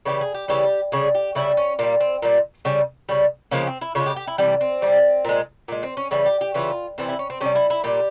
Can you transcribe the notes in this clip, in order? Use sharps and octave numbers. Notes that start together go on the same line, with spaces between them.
C#3 E3 G3 G4
G#4
G4
C#3 E3 G3 G4
C#3 G3 G#4
G4
C#3 G3 E4
C#4
A#2 G3 A#3
C4
A#2 G3
C#3 G3
C#3 G3
C#3 F3 G#3 A#3
C4
E4
C#3 F3 G#3 F4
G4
G4
E4
C3 E3 G3
C4
C3 E3 G3
A#2 G#3
A#2 G#3
C4
C#4
C#3 E3 G3 G#4
G4
G4
C#3 E3 G3 F4
C3 E3 G3 C4
E4
C#4
C4
C3 E3 G3 C#4
E4
E4
A#2 G3 G4